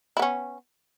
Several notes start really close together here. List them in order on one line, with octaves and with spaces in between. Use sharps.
E4 B3 C#4